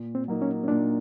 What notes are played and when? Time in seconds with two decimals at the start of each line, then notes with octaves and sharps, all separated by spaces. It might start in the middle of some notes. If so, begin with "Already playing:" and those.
Already playing: A#2
0.15 C4
0.28 F#3 A#3 D#4
0.42 C#4
0.64 C#4
0.68 A#2 D4